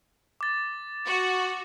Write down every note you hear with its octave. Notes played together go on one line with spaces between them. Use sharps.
D6 A6
F#4